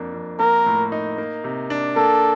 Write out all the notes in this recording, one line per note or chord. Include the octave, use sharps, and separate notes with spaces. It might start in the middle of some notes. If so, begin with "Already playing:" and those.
Already playing: F2 A#3 D4
F2
A#3 A#4
A2
D#4
A#3
C3
D4
A#3 A4